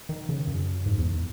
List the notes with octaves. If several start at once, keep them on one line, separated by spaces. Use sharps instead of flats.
D#3
C#3
F#2
G#2
E2